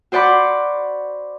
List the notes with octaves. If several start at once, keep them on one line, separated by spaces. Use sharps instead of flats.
F#4 C5 D5 F#5 B5 D6